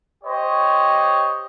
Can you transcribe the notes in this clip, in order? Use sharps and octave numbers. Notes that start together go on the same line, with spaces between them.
G4 C5 C#5 D#5